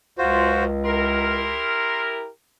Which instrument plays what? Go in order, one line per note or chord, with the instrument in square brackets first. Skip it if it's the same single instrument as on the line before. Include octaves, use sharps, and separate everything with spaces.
[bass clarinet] C#2 [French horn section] F#2 [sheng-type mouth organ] F4 F#4 C5
[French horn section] E4 G4 A#4 [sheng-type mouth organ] C6